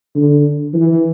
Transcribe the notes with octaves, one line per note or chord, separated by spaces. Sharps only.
D3
E3